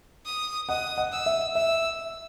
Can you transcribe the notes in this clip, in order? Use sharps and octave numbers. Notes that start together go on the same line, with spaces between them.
D#6
D#5 F#5 D#6
D#5 F#5
E6
E5
E5 E6